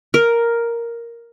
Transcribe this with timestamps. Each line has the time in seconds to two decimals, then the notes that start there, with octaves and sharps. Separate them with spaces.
0.14 A#4